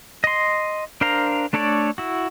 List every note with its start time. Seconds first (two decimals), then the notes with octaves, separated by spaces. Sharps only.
0.24 D#5 C6
1.01 D4 A#4 C5 F5 A#5
1.53 A3 D4 A4 C#5 D5
1.98 E4 F#4